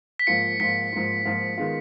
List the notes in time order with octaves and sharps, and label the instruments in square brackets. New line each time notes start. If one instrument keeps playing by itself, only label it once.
[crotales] B6
[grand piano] G#2 F3 A#3 F4 [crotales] C#7
[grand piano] G#2 F3 A#3 F4 [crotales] B6
[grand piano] G#2 F3 A#3 F4
G#2 F3 A#3 F4
D#3 G#3 B3 F4